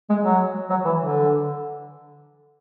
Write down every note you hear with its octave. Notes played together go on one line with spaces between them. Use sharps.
G#3
F#3
F#3
E3
D3